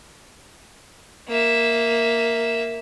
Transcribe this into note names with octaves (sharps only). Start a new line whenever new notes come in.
A#3 E5